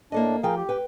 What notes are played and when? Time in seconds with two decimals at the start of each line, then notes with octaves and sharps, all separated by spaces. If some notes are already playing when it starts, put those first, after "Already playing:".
0.12 A2 A#3 D4 A4 D#5
0.43 F3 G#4 A#4 F5 G5
0.57 G4
0.69 B4 G5